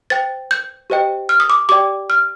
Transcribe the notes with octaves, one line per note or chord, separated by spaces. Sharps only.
C5 G5 A6
G6
G4 C5 D#5 G5
F6
D#6
D6
G4 D5 G5 D6
F6